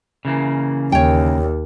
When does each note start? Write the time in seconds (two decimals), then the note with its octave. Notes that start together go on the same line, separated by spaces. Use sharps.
0.25 C#3 E3 A#3
0.92 D#2 C#5 G5